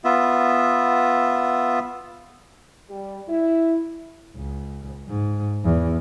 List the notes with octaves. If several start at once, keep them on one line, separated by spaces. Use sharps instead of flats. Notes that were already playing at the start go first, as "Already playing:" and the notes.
B3 F4 E5
G3
E4
C#2
G#2
E2